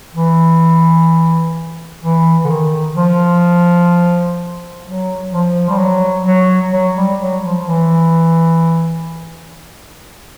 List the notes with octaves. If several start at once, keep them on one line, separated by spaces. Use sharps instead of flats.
E3
E3
D3
D#3
F3
F#3
F3
G3
F#3
F#3
F#3
G3
F#3
F3
E3